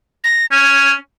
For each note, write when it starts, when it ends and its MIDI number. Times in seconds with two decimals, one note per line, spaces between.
0.24 0.46 94
0.51 0.93 61
0.51 0.92 92